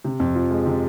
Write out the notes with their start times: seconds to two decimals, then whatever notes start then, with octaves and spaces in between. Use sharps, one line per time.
0.04 C3
0.20 F2
0.35 F3
0.51 G#3
0.66 C3